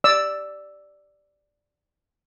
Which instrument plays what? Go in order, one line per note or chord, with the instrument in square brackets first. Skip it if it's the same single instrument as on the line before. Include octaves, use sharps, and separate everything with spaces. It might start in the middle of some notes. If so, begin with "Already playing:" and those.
[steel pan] D5 E6